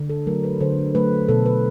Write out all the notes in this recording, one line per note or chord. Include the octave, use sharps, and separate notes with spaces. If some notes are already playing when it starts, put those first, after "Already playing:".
Already playing: D3
A4
F#3 A3 A#4
B4
D3 C5
F#3 A3 B4
B2 A4
B4